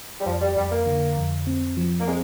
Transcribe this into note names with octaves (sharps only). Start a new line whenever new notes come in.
G3
F2 F3
G3
F2 G3
A#3
D3
F2
C4
F3
A#3
G#3 C4